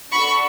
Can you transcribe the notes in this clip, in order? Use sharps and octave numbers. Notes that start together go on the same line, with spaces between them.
D4 F#4 A4 B5 C#6